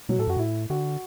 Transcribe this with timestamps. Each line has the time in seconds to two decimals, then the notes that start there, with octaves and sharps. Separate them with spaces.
0.09 B2 F#3
0.19 A2 A4
0.27 F#2 F#4
0.37 A2 E4
0.70 D3 F#4